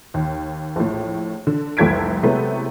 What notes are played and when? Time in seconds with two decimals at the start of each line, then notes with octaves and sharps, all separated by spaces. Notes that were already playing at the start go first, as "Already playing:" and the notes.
0.14 D#2
0.76 A#1 A2
1.47 D3
1.77 F1 C2 A4 G#6 B6 D7
2.23 C3 F#3 G#3 A3 B3 E4